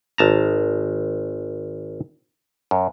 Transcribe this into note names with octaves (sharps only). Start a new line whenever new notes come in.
G#1 A5 A#5
F#2